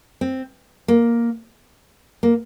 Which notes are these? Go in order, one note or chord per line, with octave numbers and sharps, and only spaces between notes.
C4
A#3
A#3